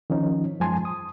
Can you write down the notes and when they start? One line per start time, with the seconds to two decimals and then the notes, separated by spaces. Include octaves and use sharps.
0.10 D#3 F3 C#4 D#4
0.60 F#2 F3 G#3 G#5 A5 C6
0.85 D#6